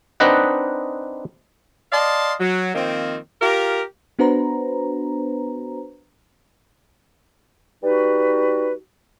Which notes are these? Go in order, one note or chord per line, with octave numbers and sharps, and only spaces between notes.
C4 D4 D#4 B4 D#5 F#5
D5 D#5 F5 A5 C6
F#3
D#3 F3 A#3 C4
F4 G4 A#4
B3 D4 F#4 B4 C5 A#5
G3 D#4 F#4 B4